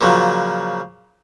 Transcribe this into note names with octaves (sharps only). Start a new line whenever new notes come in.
A#2 C#3 F3 F#3